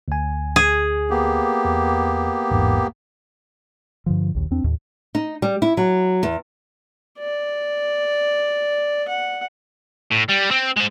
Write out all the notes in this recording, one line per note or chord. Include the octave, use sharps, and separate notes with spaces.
D2 G#5
G#4
A#3 B3 G4
E2
A1 E2 G#2
G2 D3 F3
A#1 D#2
E2 C4 D4
D#2 A2
D#4
G3
E4
F#3
E2
D5
F#5
A2
G3
C4
G#3 C5